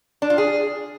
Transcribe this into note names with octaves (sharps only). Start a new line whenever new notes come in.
D4
F4
G#4